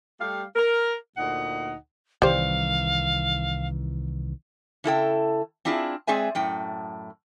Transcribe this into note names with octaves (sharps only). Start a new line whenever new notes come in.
G3 A3 G4 F5
A#4
D2 A#2 D#4 F#5
C2 D#3 E3 G3 C5 F5
C#3 E4 A4 G5
C4 D4 E4 F4 G#4
G#3 C4 G#4 D5 E5 G#5
F#2 A2 G5